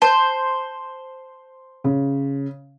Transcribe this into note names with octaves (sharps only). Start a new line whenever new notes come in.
C5 A5
C#3